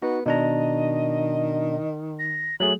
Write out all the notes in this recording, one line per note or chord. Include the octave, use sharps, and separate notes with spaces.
B3 D#4 F#4
B2 D#3 D4 D#5 A#5
A#6
F#3 A3 G#4 F#7